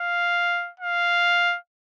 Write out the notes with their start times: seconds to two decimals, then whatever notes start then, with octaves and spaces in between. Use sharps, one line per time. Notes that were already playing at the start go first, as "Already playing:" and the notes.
Already playing: F5
0.80 F5